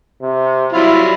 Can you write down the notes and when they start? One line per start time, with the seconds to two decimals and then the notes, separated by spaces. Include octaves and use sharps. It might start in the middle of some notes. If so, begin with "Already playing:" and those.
0.22 C3
0.73 F#3 G3 E4 F4